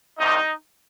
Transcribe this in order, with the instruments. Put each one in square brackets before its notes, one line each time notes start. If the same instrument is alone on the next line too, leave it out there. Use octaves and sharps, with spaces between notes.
[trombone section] C2 C3 D#3 D#4